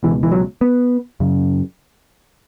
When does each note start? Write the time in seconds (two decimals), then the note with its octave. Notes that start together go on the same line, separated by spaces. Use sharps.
0.03 C#2 B2 E3
0.23 E3
0.32 F#3
0.61 B3
1.20 F#2 C#3